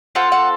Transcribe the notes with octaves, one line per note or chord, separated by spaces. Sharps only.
C4 F4 A4 F#5
F#5